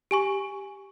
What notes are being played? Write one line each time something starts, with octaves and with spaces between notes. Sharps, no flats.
G4 G#5 C#6